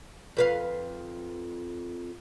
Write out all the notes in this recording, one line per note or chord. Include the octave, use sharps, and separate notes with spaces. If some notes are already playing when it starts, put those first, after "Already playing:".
F2 B4 F5